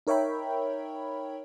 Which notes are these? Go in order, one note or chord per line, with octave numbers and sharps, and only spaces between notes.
D#4 A#4 C#5 E5 G5 B5